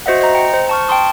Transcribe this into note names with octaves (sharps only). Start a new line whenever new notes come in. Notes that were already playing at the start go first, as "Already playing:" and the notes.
F#4 C5 D#5 E5 F#5
C5 D#5 A#5
G5 A#5 C#7
C5
A5 C#6 F6
G5 A5 C6 D#6